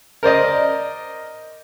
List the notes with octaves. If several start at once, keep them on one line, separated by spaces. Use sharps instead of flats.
A#4 C5 D5 D#5